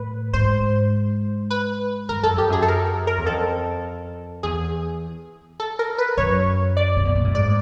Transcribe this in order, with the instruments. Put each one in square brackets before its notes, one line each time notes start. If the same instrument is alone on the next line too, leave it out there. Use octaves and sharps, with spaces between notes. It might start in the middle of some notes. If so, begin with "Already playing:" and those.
Already playing: [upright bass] A2 [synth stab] B4
[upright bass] G#2 [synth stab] C5
[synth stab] B4
[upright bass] G2 [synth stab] A#4
[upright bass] F#2 [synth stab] A4
[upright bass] F2 [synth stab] G4
[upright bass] F#2 [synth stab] G#4
[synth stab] A4
A#4
A#4
[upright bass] E2
[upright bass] F2 [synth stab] A4
[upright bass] E2 [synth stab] G#4
[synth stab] A4
A#4
B4
[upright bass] F#2 [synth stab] C#5
[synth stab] D5
[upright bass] C3
B2
A#2
A2
[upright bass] G#2 [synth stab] D5